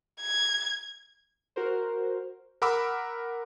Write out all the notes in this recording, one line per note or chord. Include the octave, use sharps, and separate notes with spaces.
G#6
F#4 A#4 C5
A#4 F#5 B5 D6 E6